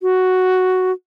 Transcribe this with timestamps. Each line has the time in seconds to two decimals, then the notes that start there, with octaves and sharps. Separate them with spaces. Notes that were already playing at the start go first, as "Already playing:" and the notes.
0.02 F#4